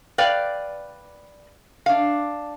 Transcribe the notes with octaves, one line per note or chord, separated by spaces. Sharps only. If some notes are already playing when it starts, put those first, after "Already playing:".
B4 D5 F5 G5
D4 F5